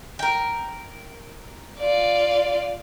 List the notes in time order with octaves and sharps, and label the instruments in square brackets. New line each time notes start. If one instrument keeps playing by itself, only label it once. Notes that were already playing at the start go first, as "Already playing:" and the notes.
[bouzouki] A#4 G5
[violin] F4 D5